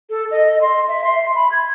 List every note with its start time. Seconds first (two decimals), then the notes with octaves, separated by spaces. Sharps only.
0.10 A4
0.31 D#5
0.61 C6
0.89 E5
1.04 C6
1.35 B5
1.52 G#6